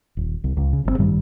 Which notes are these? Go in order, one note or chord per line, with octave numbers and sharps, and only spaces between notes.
D#1
C2
C#2
C#3
G1 D3 C4
A1 G2 D#3 G3